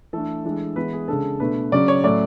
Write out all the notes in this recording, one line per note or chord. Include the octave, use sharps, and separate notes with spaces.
E3 A3 D4 A4
E3 G#3 D4
E3 G#3 B3 B4
G#4
C#3 G#3 D4 A4
B2 A3 D4 B4
C#3 F#3 C#4 D5
C#5
A2 F#3 A3 C#4 D5